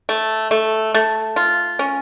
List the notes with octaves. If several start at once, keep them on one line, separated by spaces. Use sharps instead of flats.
A3
A3
A3
F4
C#4